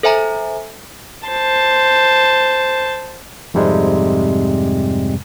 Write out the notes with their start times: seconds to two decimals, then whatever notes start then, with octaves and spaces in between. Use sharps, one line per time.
0.03 A4 C5 E5 G#5 A#5
1.28 C5 A5
3.54 F2 G#2 C3 G3 G#3